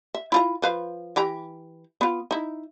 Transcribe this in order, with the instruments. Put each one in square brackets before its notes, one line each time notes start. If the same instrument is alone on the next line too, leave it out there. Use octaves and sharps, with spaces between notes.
[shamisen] E5
E4 F4 A#5
F3 B4 F5
E3 G4 A#5
B3 F4
D#4 E4